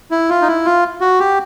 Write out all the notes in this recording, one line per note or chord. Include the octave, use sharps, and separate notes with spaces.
E4
F4
D#4
E4
F4
F#4
G4